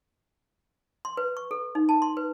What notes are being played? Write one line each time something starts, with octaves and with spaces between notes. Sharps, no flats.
C6
B4
C#6
A4
D#4
A5
C6
B4